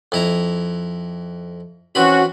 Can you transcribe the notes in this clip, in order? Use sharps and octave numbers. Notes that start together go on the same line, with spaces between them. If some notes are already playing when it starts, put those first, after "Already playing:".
F2 E4 A#5
E3 C4 C#4 F#4 B5